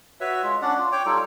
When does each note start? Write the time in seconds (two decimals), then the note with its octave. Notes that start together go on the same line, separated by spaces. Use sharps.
0.21 F#4 B4 C#5 E5
0.43 G#3 F4
0.62 C#4 D4 D5 F#5
0.79 F4
0.92 C#5 G5 D6
1.06 G3 D#4 F4 A4